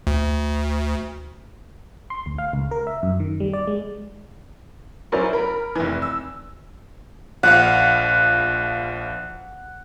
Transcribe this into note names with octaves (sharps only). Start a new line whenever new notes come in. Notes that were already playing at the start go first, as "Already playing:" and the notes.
D2
C6
D2
F5
C#2
A#4
E5
F#2
D#3
G3
D5
G#3
F#3 C#4 E4 A#4 C5 D5
A#4 B5
F1 E3
E6
A#1 F3 F5 F#5